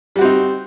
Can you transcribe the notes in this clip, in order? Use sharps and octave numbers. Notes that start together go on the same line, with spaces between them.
G3 C4 D#4 F#4